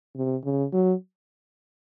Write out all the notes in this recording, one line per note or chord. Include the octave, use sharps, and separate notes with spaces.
C3
C#3
F#3